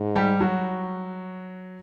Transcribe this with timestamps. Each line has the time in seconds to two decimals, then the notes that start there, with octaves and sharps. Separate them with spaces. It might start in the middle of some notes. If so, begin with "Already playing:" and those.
Already playing: G#2
0.16 G3 G4
0.40 F#3 F#4